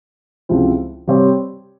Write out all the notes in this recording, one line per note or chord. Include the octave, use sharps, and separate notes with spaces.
C#2 C3 F3 C4 E4
C3 G3 C4 G4 C#5